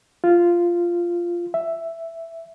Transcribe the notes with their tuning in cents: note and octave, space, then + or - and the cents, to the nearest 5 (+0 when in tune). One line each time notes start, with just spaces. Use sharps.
F4 -10
E5 +5